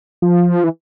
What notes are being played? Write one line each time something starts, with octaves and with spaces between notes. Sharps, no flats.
F3
E3